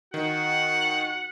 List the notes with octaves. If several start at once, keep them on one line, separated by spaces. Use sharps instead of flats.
D#3 F#4 F#5